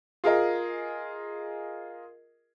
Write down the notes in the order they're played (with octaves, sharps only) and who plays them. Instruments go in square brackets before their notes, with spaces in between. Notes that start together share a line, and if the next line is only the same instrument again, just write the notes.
[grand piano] F4 G#4 A#4 D#5